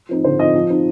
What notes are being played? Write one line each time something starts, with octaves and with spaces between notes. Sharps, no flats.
F3 C4 D#4
D3 C5
F3 C4 D#4 D#5
F3
C4 D#4